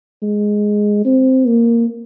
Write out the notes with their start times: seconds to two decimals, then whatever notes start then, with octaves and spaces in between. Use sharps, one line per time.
0.22 G#3
1.05 C4
1.47 A#3